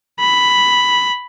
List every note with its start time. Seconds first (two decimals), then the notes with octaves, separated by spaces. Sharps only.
0.20 B5